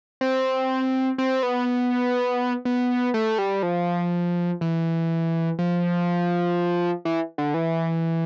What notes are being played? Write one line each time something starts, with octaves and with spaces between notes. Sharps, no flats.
C4
C4
B3
B3
A3
G3
F3
E3
F3
E3
D3
E3